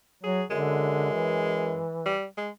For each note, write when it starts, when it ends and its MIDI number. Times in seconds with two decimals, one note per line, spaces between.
0.24 0.43 54
0.24 0.44 68
0.50 1.78 42
0.50 1.10 50
0.50 1.91 56
1.13 2.13 52
2.06 2.25 55
2.37 2.50 56